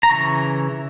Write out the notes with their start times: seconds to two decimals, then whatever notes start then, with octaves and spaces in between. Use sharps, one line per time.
0.03 A#5
0.10 C#3 E3 C#6